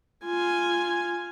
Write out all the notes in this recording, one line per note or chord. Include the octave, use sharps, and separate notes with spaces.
F4 G#5